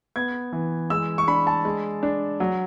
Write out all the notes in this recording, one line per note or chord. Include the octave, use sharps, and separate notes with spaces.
B3 G#6
E3
G#3 E6
C#6
D4 B5
A5
G#3
D4
F#3